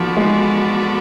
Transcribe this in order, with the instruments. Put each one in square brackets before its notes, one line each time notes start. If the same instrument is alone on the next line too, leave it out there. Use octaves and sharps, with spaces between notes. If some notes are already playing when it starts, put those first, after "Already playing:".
Already playing: [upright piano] F3 [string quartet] B3 F#4 A4 D5
[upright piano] G#3